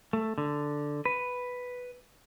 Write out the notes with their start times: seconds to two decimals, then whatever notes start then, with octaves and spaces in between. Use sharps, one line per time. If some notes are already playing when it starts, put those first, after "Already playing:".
0.13 A3
0.38 D3
1.05 B4